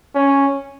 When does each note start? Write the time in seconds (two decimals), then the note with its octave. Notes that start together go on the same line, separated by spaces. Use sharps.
0.15 C#4